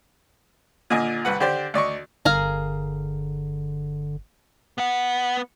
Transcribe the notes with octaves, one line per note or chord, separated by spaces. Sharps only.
A#2 D3 D#5 G#5
C2 B4 F#5
D3 G4 C5 D5
D2 D5 D#5 C#6
G1 D3 G#4 A#4 F5
B3 F#5